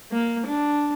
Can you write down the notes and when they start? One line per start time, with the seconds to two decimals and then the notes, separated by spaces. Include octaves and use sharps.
0.12 A#3
0.47 D4